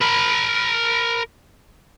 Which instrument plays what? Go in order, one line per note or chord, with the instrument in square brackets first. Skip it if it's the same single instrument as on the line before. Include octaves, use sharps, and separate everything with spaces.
[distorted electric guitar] A#4 B5